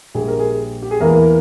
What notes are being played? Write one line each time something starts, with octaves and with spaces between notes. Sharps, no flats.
A#1 A#2 G3 G#4
A#4
G#4
G4
G#4
E2 E3 A#3 A#4